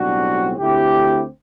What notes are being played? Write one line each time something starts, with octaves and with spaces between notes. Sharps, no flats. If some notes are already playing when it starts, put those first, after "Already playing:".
Already playing: B1 A2 G3 C4 D4 F#4
D2 D3 A3 C4 E4 G4